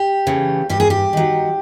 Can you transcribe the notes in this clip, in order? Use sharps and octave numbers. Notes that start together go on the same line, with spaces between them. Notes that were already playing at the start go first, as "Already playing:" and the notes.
Already playing: G4
C#3 E3 A3
G2 G4
G#4
G4
D#3 F#3